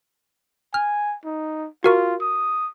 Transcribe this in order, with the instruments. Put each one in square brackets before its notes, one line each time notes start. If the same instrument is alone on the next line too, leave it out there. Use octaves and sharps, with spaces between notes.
[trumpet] G#5 [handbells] F6
[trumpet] D#4
[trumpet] F4 [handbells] F#4 A#4 C#6
[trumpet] D#6